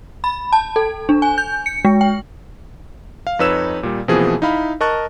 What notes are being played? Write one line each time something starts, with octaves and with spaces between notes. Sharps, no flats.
B5
A5
A4
D4
G#5
G6
C#7
G#3
G5
F5
F2 D#4 B4 C#5 E6 E7
A#2 G3
B2 E3 F3 A#3 C4 G#4
D#4 E4 F5 B5
A#4 D#5 A5 C#6 F#6 A6